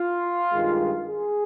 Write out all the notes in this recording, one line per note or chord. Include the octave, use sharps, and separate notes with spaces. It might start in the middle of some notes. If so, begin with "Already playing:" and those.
Already playing: F4
G2 D#3 G#3
G#4